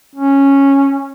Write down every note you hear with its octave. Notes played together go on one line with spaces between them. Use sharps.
C#4